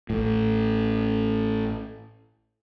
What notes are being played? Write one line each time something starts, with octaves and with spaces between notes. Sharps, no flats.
A1 A2